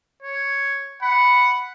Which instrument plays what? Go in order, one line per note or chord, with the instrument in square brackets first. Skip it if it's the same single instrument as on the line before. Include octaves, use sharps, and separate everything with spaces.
[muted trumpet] C#5
[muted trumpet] F#5 [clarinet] B5